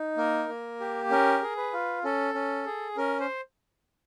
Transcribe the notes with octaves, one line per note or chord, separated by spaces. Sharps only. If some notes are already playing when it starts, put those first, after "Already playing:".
Already playing: D#4
A#3 A#4
A#3
G4
C#4 A#4
G#4
B4
F4
C#4 A4
C#4
G#4
C#4 A#4
C5